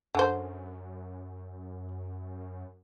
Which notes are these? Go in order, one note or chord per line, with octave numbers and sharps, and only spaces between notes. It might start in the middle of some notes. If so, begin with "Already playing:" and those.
F#2 D3 C5